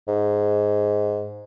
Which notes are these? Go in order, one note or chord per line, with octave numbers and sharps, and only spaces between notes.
G#2